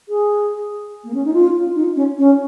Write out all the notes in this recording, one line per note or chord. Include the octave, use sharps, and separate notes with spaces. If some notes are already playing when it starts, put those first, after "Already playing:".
G#4
A#3
C#4
D#4
F4
D#4
C#4
C#4